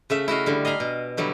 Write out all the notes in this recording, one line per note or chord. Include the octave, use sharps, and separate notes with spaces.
C#3 A3 E5
E4 F#4 D#5 F5
D3 G3
D#5 F5 G#5 A#5 B5
B2
D3 F#3 G3 E4